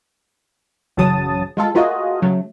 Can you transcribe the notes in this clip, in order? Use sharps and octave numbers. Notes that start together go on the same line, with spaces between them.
A1 F#2 C#3 F#3 A5 D#6
G#3 F4 A4
A3 A#3 F4 F#4 G#4 D#5
C#3 F#3 A3